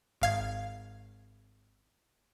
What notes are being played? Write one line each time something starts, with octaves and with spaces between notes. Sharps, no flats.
G#1 F5 G#6